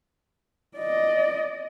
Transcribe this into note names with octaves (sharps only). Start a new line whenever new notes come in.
D5 D#5